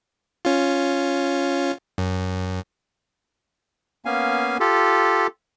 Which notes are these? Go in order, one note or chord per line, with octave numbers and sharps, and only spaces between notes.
C#4 F4
F#2
A#3 B3 C#4 F5 G#5
F4 G4 A4